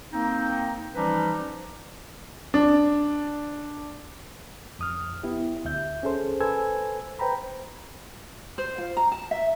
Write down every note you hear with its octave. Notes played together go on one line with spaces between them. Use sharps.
A#3 C4 D#4
E3 F3 G3 C#4 D#4 B4
D4
F2 D#6 F6
B3 E4 G4
D2 E5 G6
C#4 G#4 A4 C5
A4 B4 C5 G#5 E6 G#6
B4 C5 G5 A#5 B5
C5
F4
A#5
A5
E5